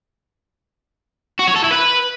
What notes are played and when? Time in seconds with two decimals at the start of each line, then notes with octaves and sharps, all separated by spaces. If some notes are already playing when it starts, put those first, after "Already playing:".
1.39 F#4
1.47 C#5
1.56 A4
1.64 E4
1.72 B4